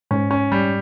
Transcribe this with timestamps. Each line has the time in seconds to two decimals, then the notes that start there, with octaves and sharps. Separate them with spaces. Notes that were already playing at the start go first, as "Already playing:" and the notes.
0.11 G#2 C#4
0.31 C#4
0.52 G3